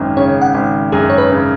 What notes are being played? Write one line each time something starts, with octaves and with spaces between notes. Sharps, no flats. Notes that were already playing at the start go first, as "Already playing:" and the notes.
Already playing: G#1 F#2
C#3 C#5
F#5
G#1
F#2 G#4
C#5
B4
C#3